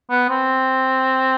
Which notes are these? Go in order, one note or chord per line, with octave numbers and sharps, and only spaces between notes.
B3
C4